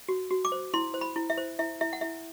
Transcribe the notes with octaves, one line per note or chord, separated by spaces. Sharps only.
F#4
F#4
D6
C5
E4 C6
C5
B5
E4
E5
C5
E4 E5
E4 E5
F#5
E4 E5